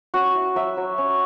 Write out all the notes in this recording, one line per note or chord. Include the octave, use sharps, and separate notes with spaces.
C#4 F#4
E4
F#3 E5
F#3
C#4